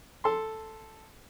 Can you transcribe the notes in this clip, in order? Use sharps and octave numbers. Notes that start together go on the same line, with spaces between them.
A4 C6